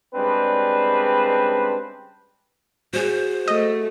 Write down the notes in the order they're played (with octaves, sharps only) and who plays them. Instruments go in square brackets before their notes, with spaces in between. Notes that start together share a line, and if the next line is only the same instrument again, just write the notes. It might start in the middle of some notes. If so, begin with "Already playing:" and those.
[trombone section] C#3 G3 G#3 C4 D4 B4
[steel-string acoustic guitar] F#4 G#4 [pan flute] C5
[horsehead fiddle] A3 [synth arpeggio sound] D#5